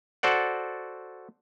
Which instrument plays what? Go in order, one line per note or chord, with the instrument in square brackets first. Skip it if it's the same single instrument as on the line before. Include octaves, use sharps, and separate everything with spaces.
[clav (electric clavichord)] F#4 A4 C5 D5 F#5